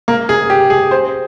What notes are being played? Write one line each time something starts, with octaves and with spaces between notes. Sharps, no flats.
A#3
G#4
G4
G#4
C5